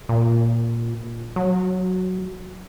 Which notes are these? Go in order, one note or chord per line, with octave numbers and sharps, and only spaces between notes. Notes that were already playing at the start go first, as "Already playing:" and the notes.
A#2
F#3